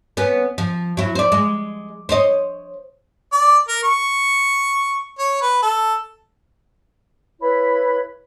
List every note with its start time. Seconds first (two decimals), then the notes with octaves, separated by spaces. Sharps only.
0.17 B3 C#4
0.58 F3
0.97 F#3 E4
1.15 C5 D5
1.32 G#3
2.09 C5 C#5 D#5
3.32 D5
3.68 A#4
3.83 C#6
5.18 C#5
5.41 B4
5.62 A4
7.39 E4 B4 C#5 B5